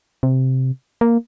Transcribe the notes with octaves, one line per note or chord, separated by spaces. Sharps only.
C3
A#3